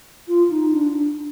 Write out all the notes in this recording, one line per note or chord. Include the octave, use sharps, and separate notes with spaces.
F4
D#4
D4